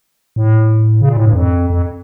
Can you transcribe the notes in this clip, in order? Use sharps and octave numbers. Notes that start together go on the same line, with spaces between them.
A2
C#3
A#2
A2
G2
F2
F2